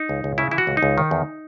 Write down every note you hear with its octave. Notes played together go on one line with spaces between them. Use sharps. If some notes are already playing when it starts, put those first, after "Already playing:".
Already playing: D#4
C#2
C#2
C#3 E4
E3 E4
F#4
C#2
D#4
C#2
D#3
E2